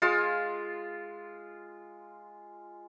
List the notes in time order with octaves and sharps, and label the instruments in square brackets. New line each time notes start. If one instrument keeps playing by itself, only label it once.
[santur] G#3 F4